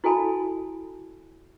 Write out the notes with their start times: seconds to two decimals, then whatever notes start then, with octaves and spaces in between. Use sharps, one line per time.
0.04 E4 F#4 A4 G#5 A5 B5